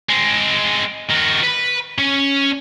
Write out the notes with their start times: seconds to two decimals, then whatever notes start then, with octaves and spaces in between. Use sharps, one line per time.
0.09 G#3 C4
1.10 D#3 F#4
1.43 B4 B5
1.98 C#4